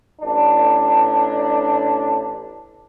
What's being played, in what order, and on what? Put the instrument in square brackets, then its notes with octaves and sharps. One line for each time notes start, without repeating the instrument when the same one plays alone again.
[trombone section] A1 D4